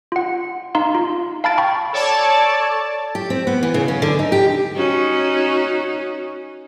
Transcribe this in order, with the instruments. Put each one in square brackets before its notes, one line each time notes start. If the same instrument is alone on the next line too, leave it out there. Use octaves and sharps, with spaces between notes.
[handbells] F4 F#5
D#4 F5 C6
F4
F5 A5 B5 F6 A6 D7
G5 B5 C#6
[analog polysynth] A4 C#5 D5 A5
[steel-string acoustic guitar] G4
C4
B3
E3
C#3
C#4
D3
D#4
G4
[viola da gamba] C#4 D#4 F#4